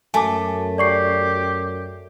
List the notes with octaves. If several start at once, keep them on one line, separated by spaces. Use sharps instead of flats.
F#2 A3 G#5 A5 D6
G4 D5 C#6 C7